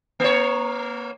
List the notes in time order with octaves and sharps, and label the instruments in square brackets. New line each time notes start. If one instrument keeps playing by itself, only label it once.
[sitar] A#3 C#5